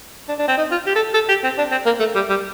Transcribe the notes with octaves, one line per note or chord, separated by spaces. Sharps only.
D4
D4
C4
D#4
F4
G4
A4
A4
G4
C4
D4
C4
A#3
A3
G3
G3